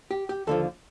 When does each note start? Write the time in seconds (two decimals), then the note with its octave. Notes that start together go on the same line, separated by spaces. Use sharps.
0.11 G4
0.29 G4
0.47 D#2 D3 F3 A4